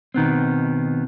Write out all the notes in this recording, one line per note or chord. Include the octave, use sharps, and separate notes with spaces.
B2 D#3 B3 C4